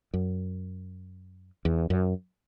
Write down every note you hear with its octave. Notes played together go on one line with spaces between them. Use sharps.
F#2
E2
F#2